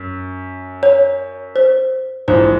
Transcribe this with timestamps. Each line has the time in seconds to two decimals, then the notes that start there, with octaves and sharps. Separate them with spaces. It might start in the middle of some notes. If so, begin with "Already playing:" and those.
Already playing: F#2
0.83 C#5
1.56 C5
2.28 A#1 G#2 E3 C5